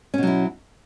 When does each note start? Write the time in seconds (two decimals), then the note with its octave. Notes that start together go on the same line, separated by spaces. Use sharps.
0.14 C#4
0.18 B2
0.23 F#3
0.27 E4